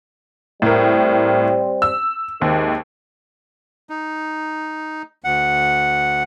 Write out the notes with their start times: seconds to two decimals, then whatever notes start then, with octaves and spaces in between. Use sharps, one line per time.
0.62 A2 G3 C4 A#4
1.82 E6
2.41 D#2 G#2 C3 D#3
3.90 D#4
5.24 D2 F#5